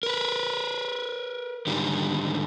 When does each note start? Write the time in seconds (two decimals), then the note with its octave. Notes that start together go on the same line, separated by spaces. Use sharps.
0.03 A#4 B4
1.67 G#2 D3 D#3 G3